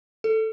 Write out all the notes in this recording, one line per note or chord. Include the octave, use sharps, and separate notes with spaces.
A4